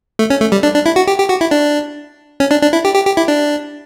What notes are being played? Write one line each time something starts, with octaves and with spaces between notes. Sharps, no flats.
A3
C#4
A3
G3
D4
D4
E4
F#4
G4
G4
F#4
E4
D4
C#4
D4
D4
E4
G4
G4
G4
E4
D4